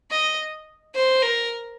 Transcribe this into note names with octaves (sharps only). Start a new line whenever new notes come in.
D#5
C5
A#4